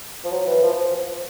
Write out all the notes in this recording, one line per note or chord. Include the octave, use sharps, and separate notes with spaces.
F3
F#3
E3
F3
F3